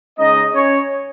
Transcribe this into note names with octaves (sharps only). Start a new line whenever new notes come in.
C#3 G#3 C#4 D#4 D#5
C#4 C#5